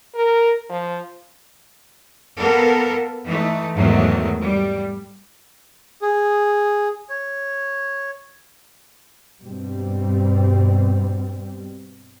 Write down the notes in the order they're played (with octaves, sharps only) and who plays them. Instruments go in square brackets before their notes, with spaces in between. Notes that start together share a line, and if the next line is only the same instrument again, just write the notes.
[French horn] A#4
F3
[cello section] A#3 B3 A4 A#4
E3 A3 D#4
E2 G#2 D#3 F#3 A3
G3
[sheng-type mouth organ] G#4
C#5
[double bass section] G2 B2 G3 C4